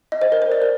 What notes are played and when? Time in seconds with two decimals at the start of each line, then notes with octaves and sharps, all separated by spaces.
0.12 D#5
0.22 C5
0.32 A#4
0.42 C5
0.52 D5
0.62 A#4